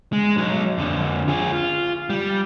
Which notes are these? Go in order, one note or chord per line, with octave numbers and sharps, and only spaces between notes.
G#3
F#3 D#4
F2 D3
F4 G#4
F4
G3